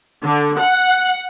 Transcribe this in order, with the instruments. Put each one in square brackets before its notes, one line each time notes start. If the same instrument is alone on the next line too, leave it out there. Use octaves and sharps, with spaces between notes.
[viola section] D3
F#5